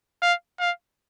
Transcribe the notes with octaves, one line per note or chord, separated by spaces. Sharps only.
F5
F5